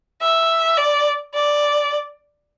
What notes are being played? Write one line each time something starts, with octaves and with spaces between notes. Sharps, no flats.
E5
D5
D5